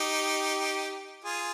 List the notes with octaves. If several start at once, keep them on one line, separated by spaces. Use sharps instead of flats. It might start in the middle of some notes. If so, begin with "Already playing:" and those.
Already playing: D#4 G4
F4 G#4